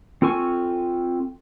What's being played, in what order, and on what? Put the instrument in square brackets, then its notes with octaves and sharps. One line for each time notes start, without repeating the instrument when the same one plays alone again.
[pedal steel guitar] C4 F4 A4 G#5 C#6